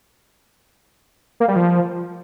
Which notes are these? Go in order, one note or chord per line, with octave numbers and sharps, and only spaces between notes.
A#3
G3
F3